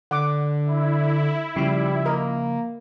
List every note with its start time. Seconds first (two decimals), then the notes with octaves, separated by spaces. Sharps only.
0.11 D3 F#5 D6
0.65 E4
1.56 C#3 F3 G3
2.06 A#3 A#4 D#5